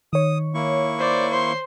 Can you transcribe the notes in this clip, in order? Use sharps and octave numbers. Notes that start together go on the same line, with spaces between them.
D#3 C#5 D#6
A#3 E4 C#6
C5 D5
C5 C6